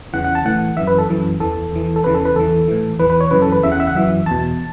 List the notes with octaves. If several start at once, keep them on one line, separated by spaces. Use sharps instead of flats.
E2 C#3 E3 F#5
F#5
A5
A2 E3 F#5
F#2 E3 E5
B4
A4
F#2 E3
E2 E3 A4
E2 E3
A4
E2 C#3 E3 B4
A4
B4
E2 E3 A4
A2 E3
E2 E3 B4
B4
C#5
F#2 C#3 E3 B4
A4
B4
E2 C#3 E3 E5
F#5
E5
F#5
F#2 E3 E5
E2 B2 A5